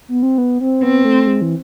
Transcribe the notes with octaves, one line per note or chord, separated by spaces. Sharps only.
B3
C4
B3
C4
B3 C4
A3
G#3
E3